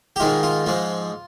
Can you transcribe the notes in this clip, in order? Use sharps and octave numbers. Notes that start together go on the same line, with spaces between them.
G4
G#2 D#3 G#3 F4
F4
G#2 F3 G#3